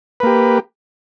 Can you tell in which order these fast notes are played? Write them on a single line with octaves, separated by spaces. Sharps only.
B4 A#3 G4